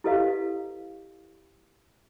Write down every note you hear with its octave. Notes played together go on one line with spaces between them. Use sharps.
E4 G4 A4 B4 D#5 F5